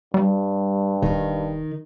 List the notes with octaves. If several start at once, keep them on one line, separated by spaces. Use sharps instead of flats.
G2 G3
E1 D#3